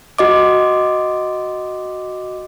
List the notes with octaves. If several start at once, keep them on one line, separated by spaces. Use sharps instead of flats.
F#4 D#5 D6